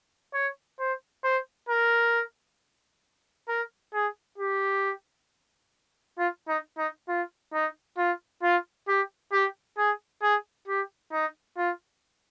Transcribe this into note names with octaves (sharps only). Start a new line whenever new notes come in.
C#5
C5
C5
A#4
A#4
G#4
G4
F4
D#4
D#4
F4
D#4
F4
F4
G4
G4
G#4
G#4
G4
D#4
F4